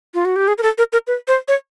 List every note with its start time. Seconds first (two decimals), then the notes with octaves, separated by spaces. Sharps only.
0.14 F4
0.25 F#4
0.36 G4
0.48 G#4
0.58 A#4
0.63 A4
0.78 A#4
0.93 A#4
1.07 B4
1.28 C5
1.48 C#5